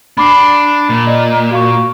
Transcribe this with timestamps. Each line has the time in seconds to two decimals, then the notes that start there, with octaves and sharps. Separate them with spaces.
0.18 D4 B5 D6 C7
0.90 A#2
1.07 D5 D#5
1.51 F#4 F5 C#6